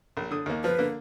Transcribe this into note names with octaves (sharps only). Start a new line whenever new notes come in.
A#1
D3 D#6
D#2 A#3
F3 B4
D3 A#3